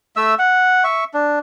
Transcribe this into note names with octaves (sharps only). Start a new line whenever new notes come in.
A3 E5 E6
F#5
E5 C#6
D4